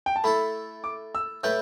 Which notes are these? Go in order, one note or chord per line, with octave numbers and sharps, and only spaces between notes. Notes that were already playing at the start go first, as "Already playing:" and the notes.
G5
A5
A3 E4 A4 B5
D6
E6
A2 A3 E4 B4 G6